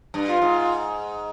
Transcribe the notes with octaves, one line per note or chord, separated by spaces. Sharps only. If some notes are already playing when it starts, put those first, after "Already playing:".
G2
F4
G#2